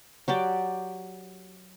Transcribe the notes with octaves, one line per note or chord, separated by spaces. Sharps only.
F#3 G4 D5